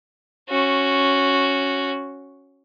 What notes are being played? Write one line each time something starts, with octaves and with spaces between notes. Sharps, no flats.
C#4 F#4